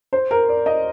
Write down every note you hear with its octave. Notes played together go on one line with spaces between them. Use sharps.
C5
A#4
D5
D#5